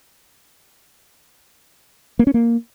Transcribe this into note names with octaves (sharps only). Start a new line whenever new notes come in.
A#3
C#4
A#3